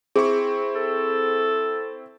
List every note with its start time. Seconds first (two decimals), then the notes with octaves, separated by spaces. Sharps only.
0.16 C4 E4 G#4 C#6
0.75 A4